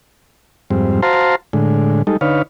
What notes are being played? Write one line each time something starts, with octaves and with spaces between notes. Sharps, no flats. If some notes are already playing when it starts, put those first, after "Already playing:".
F2 G#2 G3 C4
F#4 C5 F5 A5 A#5 C6
A2 D3 G#3
G3 G#3 D#4 A4
D3 D#4 B4 C#5 F5